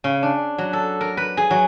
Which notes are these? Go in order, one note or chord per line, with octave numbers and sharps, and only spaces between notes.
C#3
D4
F#3
A4
A#4
B4
G#4
F#3